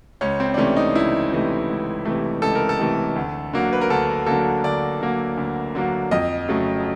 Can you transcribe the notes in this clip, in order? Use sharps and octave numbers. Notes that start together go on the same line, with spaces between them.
C#2 C#4
C4
D4
C3 E3 A3 C#4
D#4
C#2 E4
C3 E3 A3
C#2
C3 E3 A3
C#2 A4
A#4
A4
C3 E3 A3
D2
D3 F#3 A#3
B4
A#4
D2 A4
D3 F#3 A#3 A4
D2 D5
D3 F#3 A#3
D2
D3 F#3 A#3
F2 D#5
C#3 F#3 A3